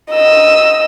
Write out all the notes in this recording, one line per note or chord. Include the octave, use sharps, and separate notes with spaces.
D#5 E6